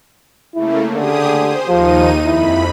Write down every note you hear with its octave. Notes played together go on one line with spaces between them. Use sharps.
C#3 A3 A#3 E4
D3 G4 G#4 D#6
C5
D#2 F3 D#4 D#7
F2 E4 B5